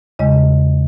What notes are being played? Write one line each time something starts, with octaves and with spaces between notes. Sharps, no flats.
E2 C#3 G#3 D#5